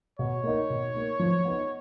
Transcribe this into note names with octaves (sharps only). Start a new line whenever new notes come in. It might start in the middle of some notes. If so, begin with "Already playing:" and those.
B2 C#5
A#3 D#4
B2
A#3 D#4
F3
B3 D#4